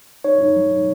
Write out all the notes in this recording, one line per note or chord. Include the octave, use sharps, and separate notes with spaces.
D#4 C#5
D#4
F#3
D#4